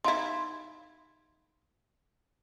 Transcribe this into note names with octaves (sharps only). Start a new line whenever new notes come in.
D#4 E4 F5 C6